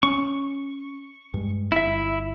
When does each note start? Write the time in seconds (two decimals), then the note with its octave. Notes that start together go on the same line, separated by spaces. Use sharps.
0.03 C#4 C#6
1.34 G2 G#3
1.72 G1 E4 E5